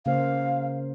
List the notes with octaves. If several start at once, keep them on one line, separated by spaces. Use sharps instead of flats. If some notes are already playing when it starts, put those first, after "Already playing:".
C#3 A#3 C5 F5